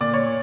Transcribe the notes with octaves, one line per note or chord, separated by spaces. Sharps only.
A#2 D5
C#5